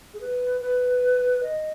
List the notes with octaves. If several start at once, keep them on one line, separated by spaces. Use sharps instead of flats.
G#4
B4
B4
D#5